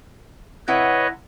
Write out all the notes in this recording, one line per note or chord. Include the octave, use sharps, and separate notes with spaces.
C3 E4 B4 C#5 D#5 F#5